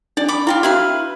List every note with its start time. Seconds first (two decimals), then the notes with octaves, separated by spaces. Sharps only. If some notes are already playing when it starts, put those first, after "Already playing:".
0.17 D4 D5
0.29 B5 D6
0.47 E4 F4 G4 F5
0.63 E4 F#4 B4 F5